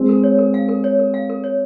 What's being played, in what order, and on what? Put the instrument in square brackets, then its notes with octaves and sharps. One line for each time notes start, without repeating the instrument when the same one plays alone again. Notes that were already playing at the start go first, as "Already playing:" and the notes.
Already playing: [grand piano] G#3 C4
[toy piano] A#4
C#5
A#4
F5
A#4
C#5
A#4
F5
A#4
C#5